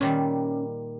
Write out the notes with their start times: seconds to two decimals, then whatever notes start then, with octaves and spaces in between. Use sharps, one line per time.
0.01 A#2 D#3 G3 C#4